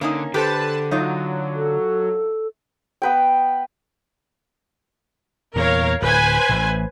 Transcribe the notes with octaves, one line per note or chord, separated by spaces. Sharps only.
D3 A#3 C#4 D#4
D3 G4 A4 B4 C5 A5
F#3 D#4 F4
A4
B3 B4 G5
E2 A#2 E3 A#4 C#5 F5
D1 B4 C5 G#5
A1 A2